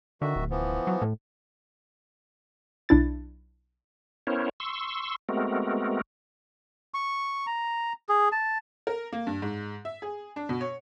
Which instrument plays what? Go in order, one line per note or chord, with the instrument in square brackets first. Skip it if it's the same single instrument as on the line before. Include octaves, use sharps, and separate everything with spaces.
[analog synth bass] D3 [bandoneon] D#3 F#4 E5
[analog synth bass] D1
[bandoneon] E3 F3 B3
[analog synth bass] F#3
A2
[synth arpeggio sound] B1 D4 E4 A6
[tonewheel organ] B3 C#4 E4 A#4 C5 C#5
C6 C#6 E6
G#3 A3 B3 C4 F#4 A#4
[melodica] C#6
A#5
G#4
A5
[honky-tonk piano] A#4
A#3
G2
G#2
E5
G#4
D4
B2
C#5